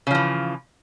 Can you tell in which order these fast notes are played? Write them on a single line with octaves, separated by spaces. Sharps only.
C#3 F3 E3